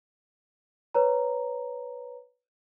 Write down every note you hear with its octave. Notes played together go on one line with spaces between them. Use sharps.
B4 C#5 A#5